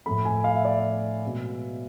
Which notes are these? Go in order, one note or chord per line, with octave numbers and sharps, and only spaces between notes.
A2 F3 A3 B5
G#5
F5
E5
D5
E5
B2 G#3